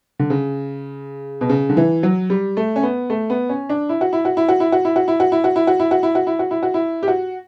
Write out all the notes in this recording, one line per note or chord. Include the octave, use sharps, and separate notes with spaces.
D3
C#3
B2
C#3
D3
E3
F#3
G3
A3
C#4
B3
A3
B3
C#4
D4
E4
F#4
E4
F#4
E4
F#4
E4
F#4
E4
F#4
E4
F#4
E4
F#4
E4
F#4
E4
F#4
E4
F#4
E4
F#4
E4
F#4
E4
G4
F#4